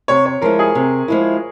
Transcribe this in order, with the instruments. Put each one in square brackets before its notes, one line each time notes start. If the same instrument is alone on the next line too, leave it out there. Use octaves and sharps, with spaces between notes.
[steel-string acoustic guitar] C3 [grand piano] C#5
[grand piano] C#5
[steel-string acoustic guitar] F3 G#3 E4 [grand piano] A#4
[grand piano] G#4
[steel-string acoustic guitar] C3
F3 G#3 E4